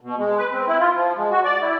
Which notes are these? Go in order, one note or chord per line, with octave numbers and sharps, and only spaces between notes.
B2
G#3
B4
C4
E4
F4
F3
G#3
F#4
D5
E4